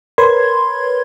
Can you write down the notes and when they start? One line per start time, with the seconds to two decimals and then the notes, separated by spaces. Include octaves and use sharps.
0.18 A#4 B4 C#5 B5 C6 G#6